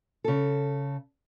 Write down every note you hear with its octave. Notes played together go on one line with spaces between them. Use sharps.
C#3 A4